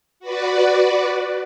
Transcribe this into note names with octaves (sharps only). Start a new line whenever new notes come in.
F#4 B4 D5